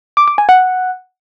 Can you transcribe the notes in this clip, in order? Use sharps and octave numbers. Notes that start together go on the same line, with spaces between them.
D6
D6
G#5
F#5